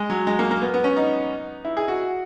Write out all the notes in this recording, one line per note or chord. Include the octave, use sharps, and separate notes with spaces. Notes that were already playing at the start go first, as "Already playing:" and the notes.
Already playing: G#3
F#3
G#3
A#3
A#3
B3
B3
C#4
D#4
E4
G#4
F#4